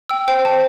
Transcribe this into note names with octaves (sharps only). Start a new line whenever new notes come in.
G5 E6
C5 G5
C5 A5